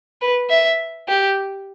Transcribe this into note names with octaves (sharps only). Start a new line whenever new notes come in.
B4
E5
G4